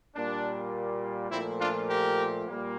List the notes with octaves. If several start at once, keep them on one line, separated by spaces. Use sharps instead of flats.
A#2 G3 A#3 D4
A#2 F3 A3 C4 E4
D4 F4
G4 A#4
A#2 G3 A#3